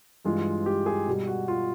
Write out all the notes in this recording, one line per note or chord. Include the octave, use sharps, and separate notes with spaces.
G2 E3 G#3 F4
G4
G#4
B2 G3
F#4
F4